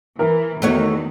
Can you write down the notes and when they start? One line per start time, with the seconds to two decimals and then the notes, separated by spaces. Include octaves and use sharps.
0.19 E3 A#4
0.62 E2 D#3 A3 F#4 C#5